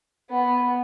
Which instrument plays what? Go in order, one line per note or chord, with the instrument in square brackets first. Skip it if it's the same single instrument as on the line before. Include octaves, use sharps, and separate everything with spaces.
[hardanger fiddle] B3